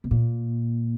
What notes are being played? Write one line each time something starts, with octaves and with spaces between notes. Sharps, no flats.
B2
A#2